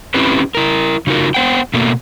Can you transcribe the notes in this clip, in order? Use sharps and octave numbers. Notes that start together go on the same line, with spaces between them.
C4 C#4 E4 G4 B4
E4 A#4
C#3 D#4 F4 F#4 A#4
B3 C5 F#5 G5
B2 A3 A#3